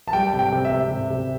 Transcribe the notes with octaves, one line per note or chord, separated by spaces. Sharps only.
A5
G3 G5
C3
G5
C3
E5
C3
C3
C3